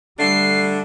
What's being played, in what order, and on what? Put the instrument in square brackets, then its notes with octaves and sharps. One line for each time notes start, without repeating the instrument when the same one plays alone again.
[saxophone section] D3 A3 D4 [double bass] G3 [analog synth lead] C7